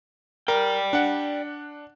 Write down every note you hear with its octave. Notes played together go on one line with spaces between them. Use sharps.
A#4 D5 G5
D4 F#5